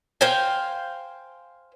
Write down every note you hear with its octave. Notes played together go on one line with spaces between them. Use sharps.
C5 F5 G5 G#5